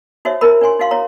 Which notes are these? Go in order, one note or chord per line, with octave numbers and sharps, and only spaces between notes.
D#4 F#4 C5 C#5 E5
D#4 E4 A#4 B5
D4 C#5 G#5 C6
D#4 F#4 F5 C6
E4 F#4 C#5 A#5